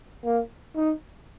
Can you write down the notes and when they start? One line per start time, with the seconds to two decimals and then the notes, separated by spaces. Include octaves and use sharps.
0.24 A#3
0.76 D#4